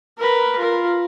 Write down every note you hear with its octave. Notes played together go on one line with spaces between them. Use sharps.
A#4 B4
F4 A#4